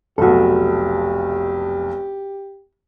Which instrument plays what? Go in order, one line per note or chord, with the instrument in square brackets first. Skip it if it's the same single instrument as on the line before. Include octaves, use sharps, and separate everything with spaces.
[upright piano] F1 B1 [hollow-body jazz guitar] F#4 A4 [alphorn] G4